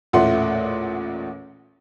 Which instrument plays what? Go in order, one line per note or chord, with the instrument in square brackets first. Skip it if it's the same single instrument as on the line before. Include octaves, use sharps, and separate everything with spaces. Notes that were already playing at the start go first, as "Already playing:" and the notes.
[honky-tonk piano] A1 E2 A#2 A3 F#5 C6